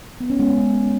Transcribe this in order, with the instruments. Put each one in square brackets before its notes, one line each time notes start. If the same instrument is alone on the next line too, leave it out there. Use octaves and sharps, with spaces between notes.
[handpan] B3
C#4
G#3 B3